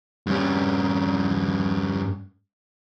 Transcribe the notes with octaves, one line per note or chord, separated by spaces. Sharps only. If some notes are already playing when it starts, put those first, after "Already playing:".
G2 C#4